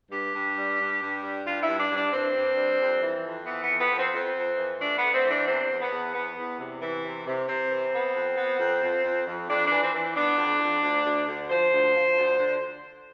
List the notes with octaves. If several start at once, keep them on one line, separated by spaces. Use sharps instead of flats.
G2 G4
G2
G3
G2
G2
G3
G2 F4
E4
G2
D4
G2
D4
G2 C4
G2
G3
F2
E3
F2
E3 B3
B3
F2
B3
F2
C4
F2 C4
F2
E3
A3 D4
B3
A3
C4
E3
D4
E2 C4
E2
B3
E2
B3
E2
C3
E3
C3
C3
C3 C4
E3
B3
F2
B3
F2
F2
F2
F2
F2 D4
E3 D4
C4
E3
B3 D4
F2
F2
D2
D2
D2
F3 C5
D2
F3
D2
D3